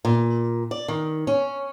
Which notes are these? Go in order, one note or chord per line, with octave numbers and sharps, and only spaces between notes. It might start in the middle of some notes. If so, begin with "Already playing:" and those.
A#2
D5
D#3
C#4